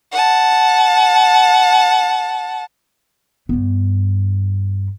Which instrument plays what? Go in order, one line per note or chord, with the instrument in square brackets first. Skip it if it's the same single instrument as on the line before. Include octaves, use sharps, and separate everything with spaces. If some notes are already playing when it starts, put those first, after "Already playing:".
[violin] F#5 A5
[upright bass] G2 B3